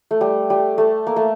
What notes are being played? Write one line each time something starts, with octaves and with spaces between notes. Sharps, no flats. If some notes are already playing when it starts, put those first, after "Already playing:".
A3
G3
G3
A3
A#3
A3